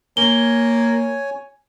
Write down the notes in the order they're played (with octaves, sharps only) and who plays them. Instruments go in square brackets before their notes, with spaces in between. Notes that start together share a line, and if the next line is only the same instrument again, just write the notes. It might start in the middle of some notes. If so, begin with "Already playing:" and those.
[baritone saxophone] A#3 [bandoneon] C#5 G#5 [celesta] G7